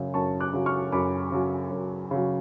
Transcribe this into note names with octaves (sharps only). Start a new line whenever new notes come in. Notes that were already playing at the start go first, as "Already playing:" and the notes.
Already playing: F#2 C#3 F#3 G#5
F#2 A5 C#6
D6 F#6
C#3 F#3
C#6 F6
F#2 B5 D6
C#3 F#3
F#2
C#3 F#3